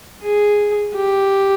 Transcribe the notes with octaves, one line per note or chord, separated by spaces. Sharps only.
G#4
G4